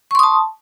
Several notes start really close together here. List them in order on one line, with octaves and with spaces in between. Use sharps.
C#6 C6 D#6 A5